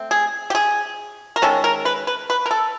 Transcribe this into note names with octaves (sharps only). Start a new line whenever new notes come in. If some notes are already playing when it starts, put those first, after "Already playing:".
Already playing: A3 C4
G#4
G4
G#4
A#4
D#3 G#3 C#4 A4
A#4
B4
B4
B4
A#4
A4